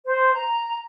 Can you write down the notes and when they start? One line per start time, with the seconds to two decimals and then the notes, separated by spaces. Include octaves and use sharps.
0.05 C5
0.33 A#5